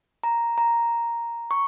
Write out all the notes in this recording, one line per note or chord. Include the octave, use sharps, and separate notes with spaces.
A#5
A#5
C#6